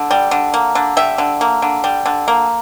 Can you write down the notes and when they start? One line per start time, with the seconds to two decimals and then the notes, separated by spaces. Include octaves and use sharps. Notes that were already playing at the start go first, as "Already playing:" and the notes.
Already playing: D3
0.11 G3
0.31 D3
0.54 A#3
0.75 D3
0.97 G3 E5
1.18 D3
1.41 A#3
1.62 D3
1.84 G3
2.06 D3
2.28 A#3